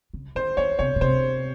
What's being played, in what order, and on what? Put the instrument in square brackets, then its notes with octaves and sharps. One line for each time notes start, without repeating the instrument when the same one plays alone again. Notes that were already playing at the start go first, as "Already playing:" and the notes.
[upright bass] C#3
[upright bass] D#3 [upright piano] C5
[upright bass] D#3 [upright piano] C#5
[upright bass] C3 [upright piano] C#5
[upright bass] A#2
[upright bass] C3 [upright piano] C5